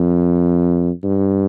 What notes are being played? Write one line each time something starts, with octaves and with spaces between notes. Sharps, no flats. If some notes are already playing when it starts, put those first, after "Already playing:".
Already playing: F2
G2